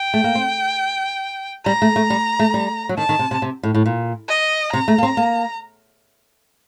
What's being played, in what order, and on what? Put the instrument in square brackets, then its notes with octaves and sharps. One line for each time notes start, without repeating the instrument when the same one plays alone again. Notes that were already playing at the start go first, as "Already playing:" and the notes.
Already playing: [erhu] G5
[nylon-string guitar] A3
A#3
C4
[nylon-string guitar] G3 [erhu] A#5
[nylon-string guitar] A3
A3
G3
A3
G3
F#3
[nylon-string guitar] D#3 [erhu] A5
[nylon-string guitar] D#3
C3
C3
C3
A2
A2
A#2
[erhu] D#5
[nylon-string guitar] C3 [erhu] A#5
[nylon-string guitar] A3
A#3
C4
A#3